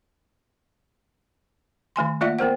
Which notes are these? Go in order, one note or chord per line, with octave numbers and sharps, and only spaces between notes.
D#3 A3 G#5 C6
A3 A#3 F4 D5 E5 F#5
B3 A#4 C5 F#5